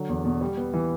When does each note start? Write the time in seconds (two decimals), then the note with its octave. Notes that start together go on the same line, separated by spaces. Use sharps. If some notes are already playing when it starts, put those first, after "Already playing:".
Already playing: D3 F#3
0.09 E2
0.25 B2
0.41 G3
0.57 B3
0.73 E3